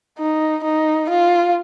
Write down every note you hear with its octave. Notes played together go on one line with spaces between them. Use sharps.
D#4
D#4
F4